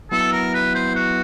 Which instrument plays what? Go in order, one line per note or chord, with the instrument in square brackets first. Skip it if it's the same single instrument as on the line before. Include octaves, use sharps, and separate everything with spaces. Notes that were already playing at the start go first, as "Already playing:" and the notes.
[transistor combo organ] F#3 B3 E4 [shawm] A4
[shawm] A#4
B4
C5
F#4